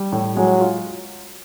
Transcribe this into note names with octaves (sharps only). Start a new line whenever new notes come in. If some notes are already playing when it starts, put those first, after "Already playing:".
Already playing: G3
A2
F#3 G#3
F4